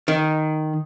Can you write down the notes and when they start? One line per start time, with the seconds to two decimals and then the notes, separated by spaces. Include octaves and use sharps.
0.08 D#3